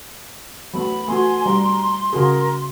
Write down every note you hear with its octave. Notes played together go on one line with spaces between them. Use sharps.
F#3 A3 B3 B5
A3 B3 F#4 G#5 C6
G3 A#5
C#3 F#4 G#4 A#4